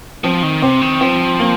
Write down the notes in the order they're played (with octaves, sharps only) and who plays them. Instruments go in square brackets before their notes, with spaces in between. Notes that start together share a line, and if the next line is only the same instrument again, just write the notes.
[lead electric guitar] F3 [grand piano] C4
[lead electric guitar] D#3
[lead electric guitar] C3 [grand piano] C4
[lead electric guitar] D#3
[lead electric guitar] F3 [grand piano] C4
[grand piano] A#3